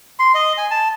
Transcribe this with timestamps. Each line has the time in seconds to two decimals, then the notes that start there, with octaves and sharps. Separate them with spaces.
0.19 C6
0.34 D#5
0.58 G#5
0.71 A5